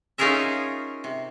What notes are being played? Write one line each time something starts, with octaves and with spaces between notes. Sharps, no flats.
C#4 D#4 F4 G#4 A#4 E5
C3